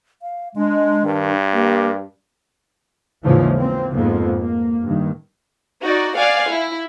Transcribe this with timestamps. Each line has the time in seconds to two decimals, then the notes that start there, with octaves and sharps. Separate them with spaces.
0.22 F5
0.56 G#3 D4
1.05 G2 D#3
1.53 A#3 G4 A#4
3.24 D#2 G#2 C#3 E3 F3
3.55 A#3 C4
3.94 F2 G#2 F3 A#3 B3
4.39 A#3
4.84 G2 D#3
5.81 D#4 F#4 D5
6.17 D5 F5 F#5 G#5
6.51 E4